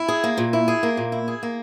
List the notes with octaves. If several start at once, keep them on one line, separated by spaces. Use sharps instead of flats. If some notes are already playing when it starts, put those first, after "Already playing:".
Already playing: E4
G#4
A#3
A#2
E4
G#4
A#3
A#2
E4
G#4
A#3